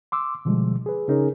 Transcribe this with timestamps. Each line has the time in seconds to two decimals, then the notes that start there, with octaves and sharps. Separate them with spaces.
0.12 C6 D6 E6
0.45 B2 D3 F3 G3 G#3
0.86 G#4 B4
1.08 C#3 C#4 D#4 G#4 A#4 C#5